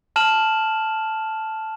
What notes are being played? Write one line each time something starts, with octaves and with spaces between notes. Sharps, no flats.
A5 F6 E7 F#7